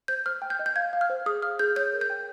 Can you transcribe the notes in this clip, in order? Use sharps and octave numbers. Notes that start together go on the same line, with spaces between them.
C5 G6
C5 F6
G5
G6
D#5
G6
F5 G#6
F5
F6
C5
G#4 D#6
F5 F6
G#4 G6
C#5 G6
A#4
G6
G5